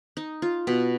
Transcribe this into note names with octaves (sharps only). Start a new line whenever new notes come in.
D#4
F4
B2